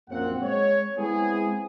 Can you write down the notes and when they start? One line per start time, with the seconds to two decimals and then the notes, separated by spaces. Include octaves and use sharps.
0.10 A#1 F#2 A#3 C4 F#5
0.43 G#3 C#5
0.97 G#3 B3 C4 E4 G#4